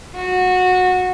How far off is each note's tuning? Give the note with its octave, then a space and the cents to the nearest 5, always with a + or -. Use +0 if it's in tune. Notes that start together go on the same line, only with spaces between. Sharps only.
F#4 -15